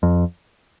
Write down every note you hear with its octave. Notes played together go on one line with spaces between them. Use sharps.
F2